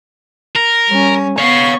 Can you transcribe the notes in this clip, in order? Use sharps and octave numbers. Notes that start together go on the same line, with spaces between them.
A#4
G3 C#4
B3 C#5 F5 C#6